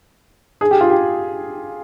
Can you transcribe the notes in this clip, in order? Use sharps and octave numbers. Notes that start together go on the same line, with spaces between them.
G#4
G4
F4
G4